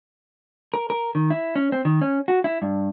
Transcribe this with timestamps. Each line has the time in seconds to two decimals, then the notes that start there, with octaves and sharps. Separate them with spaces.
0.74 A#4
0.90 A#4
1.15 D#3
1.30 E4
1.56 C#4
1.72 C4
1.85 D#3
2.02 C#4
2.28 F#4
2.44 E4
2.62 G2